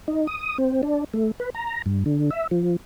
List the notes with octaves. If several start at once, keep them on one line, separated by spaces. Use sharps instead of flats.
D#4
D#6
C4
D4
A3
B4
A#5
G2
D3
E5
F3